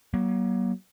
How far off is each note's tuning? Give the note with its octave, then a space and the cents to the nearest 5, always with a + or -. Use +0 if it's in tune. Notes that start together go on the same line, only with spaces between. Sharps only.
F#3 +35 A#3 +40